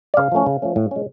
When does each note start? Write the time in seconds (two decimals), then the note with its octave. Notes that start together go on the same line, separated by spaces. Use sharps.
0.14 D5
0.17 C#3 F5
0.32 F3 A3 C#4
0.46 C#3
0.62 F3 A3 C#4
0.76 A2
0.91 G#3 C#4